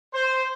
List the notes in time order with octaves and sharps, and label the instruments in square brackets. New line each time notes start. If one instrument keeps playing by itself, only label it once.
[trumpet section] C5